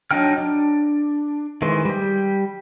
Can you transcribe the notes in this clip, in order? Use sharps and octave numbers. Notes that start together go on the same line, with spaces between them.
F#3 D4 D#4 G5 F6
D4
D#3 E3 G#3 C5
G3 G4